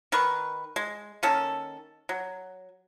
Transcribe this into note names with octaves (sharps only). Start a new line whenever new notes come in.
D#3 A#4 B4 C#6
G#3
D#3 A#3 C#4 A4
F#3